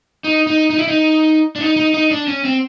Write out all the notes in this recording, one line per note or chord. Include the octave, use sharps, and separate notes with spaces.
D#4
D#4
D#4
E4
D#4
D4
D#4
D#4
D#4
D4
C#4
C4